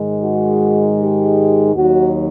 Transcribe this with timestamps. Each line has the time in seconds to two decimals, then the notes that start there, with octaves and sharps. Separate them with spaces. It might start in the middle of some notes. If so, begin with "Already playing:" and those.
Already playing: G#2 D#3 G#3
0.21 F#4
0.98 G4
1.76 D#2 D#3 F#3 F#4